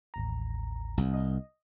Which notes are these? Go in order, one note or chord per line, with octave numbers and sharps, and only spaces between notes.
A1 D#2 A#5
C2
D#5